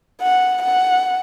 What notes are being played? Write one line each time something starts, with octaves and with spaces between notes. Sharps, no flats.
F#5
F#5